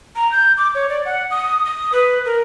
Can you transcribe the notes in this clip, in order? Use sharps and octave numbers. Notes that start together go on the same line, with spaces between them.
A#5
G6
D6
C#5
D5
F#5
D#6
D#6
B4
A#4